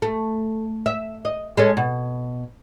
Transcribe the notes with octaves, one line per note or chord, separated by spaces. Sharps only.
A3
E5
D#5
G#3 C#4 A4
B2